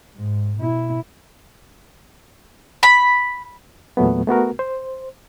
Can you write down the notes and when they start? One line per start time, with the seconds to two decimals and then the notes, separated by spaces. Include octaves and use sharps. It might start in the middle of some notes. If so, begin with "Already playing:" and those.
0.16 G#2
0.58 B2 E4
2.83 B5
3.97 E2 A#2 F#3 A3 B3
4.27 A3 B3 F#4 A#4
4.59 C5